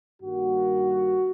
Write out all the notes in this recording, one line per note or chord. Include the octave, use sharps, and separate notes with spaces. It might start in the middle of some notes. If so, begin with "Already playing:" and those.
G2 D#3 G3 A#3 F#4